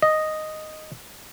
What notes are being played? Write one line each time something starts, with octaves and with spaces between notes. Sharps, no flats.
D#5